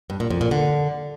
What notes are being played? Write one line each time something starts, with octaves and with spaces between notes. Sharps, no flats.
G2
A#2
F2
A#2
D3